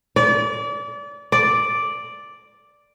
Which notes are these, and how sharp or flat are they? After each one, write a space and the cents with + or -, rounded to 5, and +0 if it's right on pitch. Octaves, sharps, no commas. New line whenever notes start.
D5 -30
D5 +0